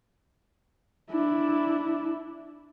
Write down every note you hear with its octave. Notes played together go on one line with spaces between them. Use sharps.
D4 E4